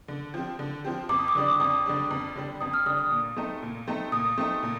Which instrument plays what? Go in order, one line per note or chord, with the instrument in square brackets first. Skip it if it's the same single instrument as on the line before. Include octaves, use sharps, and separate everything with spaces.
[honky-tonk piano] D3
F3 C4 G4
D3
F3 C4 G4
[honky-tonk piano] F2 [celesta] D6
[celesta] D#6
D6
[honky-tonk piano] D3 G3 D4 [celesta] D#6
[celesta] D6
[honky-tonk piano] F2 [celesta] D#6
[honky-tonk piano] D3 G3 D4
F2
D3 G3 D4
[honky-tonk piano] F2 [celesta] D#6
[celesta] F6
[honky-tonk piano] D3 G3 D4 [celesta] D#6
[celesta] D#6
[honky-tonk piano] A#2
A3 C4 D#4
A#2
A3 C4 D#4
[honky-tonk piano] A#2 [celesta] D#6
[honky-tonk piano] A3 C4 D#4
A#2